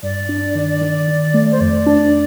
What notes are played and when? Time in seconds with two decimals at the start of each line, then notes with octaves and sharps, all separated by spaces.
0.03 G2 D5
0.29 D4
0.55 D#3
0.81 D#3
1.08 D#3
1.34 A3
1.52 C5
1.60 F2 D5
1.86 D4